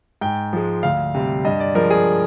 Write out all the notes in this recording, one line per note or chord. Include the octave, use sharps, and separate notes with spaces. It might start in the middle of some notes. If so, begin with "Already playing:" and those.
G#2 G5
F3 G#3
D2 F5
C3 G3
G2 D#5
D5
F3 G#3 A#4
G#4